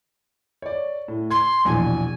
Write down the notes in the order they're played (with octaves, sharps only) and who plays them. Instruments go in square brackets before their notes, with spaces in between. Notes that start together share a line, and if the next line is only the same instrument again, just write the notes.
[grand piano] C#5 D5
A2
[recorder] C6 [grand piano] G#6
[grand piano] A#1 E2 B2 [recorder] G#5